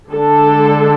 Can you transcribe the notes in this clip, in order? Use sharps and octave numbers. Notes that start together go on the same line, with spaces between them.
D3 G#3 D4 A4